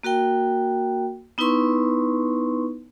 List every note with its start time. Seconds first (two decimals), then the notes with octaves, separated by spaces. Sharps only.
0.03 A#3 F#4 A#4 G5
1.38 B3 D#4 E4 B4 C6 C#6